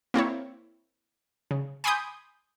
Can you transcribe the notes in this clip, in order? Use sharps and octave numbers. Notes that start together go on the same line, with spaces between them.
A#3 C4 E4 C#5
C#3
G#5 B5 C6 D6 D#6 G6